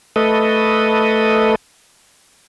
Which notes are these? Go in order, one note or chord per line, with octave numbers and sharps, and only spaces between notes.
A3 A4 B4 D#5